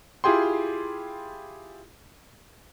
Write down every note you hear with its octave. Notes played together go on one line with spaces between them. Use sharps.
E4 F4 G4 G#4 G5 C6